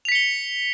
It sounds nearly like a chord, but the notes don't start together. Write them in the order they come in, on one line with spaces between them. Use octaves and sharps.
F7 B6 C#7 G7